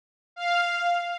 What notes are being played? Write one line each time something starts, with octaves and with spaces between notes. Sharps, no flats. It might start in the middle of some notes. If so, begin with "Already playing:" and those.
F5